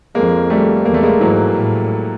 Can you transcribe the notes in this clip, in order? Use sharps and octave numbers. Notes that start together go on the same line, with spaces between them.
F2 G#3 A#3
G3 A3
E2 A#3
A3
G#3 A#3
G#2 E3 F#3
A2